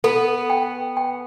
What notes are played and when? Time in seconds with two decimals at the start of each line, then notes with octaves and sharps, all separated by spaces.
0.04 B3 A4
0.50 G5
0.97 G5